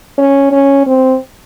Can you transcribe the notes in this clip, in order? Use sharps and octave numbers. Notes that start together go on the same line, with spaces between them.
C#4
C#4
C4